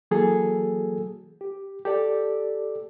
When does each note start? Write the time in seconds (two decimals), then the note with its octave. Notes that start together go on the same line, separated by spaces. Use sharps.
0.11 E3 F#3 A#3 F#4 G#4 A4
1.41 G4
1.85 G4 A4 D5